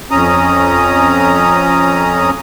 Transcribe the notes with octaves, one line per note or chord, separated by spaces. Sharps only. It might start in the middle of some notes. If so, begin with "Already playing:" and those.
F2 C#4 A#5 D#6